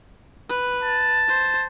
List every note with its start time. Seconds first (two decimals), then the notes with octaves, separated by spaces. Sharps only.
0.49 B4
0.83 A5
1.28 C5